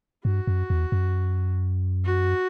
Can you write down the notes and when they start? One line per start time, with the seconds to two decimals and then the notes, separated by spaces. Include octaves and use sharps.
0.25 G2 F#4
0.47 F#2
0.70 E2
0.92 F#2
2.05 F#4